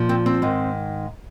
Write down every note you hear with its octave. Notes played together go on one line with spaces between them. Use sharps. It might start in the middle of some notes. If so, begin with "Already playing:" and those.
Already playing: A#2 F3
C4
C4
G#2 D#3